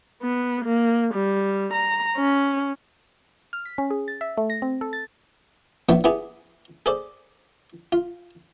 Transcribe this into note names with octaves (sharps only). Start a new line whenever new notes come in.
B3
A#3
G3
A#5
C#4
F6
B6
C#4
G#4
A6
E5
A3
A#6
C4
A4
A6
A#1 B3 D4 E4 G5
B3 E4 G4 G#4
G#4 A4 C5 D5
F4